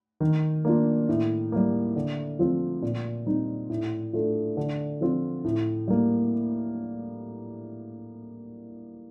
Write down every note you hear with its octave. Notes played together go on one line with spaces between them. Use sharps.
D#3
A#3 D4 F4
A2
G3 A#3
D3
F3 C4 F4
A#2
G3 C4 D#4
A2
A3 D4 F4
D3
F3 C4 F4
A2
G3 A#3